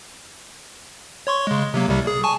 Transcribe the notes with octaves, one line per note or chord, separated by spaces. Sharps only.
C#5 C6 C#6
C#3 G#3
C3 F#3 A#3
C2 C3 G3
G#4
G#5 A5 C#6